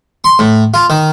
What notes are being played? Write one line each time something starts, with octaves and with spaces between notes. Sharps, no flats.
C6
A2
F4
D#3